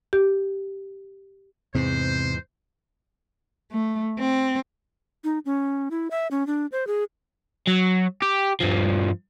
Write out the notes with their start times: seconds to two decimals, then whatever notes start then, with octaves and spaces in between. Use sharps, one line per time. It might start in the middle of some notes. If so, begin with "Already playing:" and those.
0.13 G4
1.75 E2 G#2 C3 C4 C5
3.71 A3
4.19 C4
5.24 D#4
5.46 C#4
5.91 E4
6.11 E5
6.31 C#4
6.47 D4
6.72 C5
6.87 G#4
7.67 F#3
8.22 G4
8.61 G2 F3